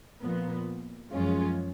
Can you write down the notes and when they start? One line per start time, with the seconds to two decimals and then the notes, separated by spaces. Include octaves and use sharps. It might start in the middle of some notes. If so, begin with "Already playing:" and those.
0.21 A#2 F3 B3
1.12 F#2 F3 G#3 C#4 F4